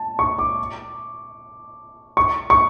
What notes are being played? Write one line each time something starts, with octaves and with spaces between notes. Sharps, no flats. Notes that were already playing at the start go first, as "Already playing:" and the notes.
Already playing: A5
C#6
D6
C#6
C#6